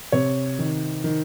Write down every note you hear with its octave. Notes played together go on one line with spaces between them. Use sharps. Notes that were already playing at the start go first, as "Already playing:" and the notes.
C3 C#5
D#3
D#3